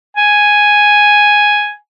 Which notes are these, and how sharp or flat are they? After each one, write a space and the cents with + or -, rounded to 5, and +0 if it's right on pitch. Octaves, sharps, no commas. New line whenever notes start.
G#5 +0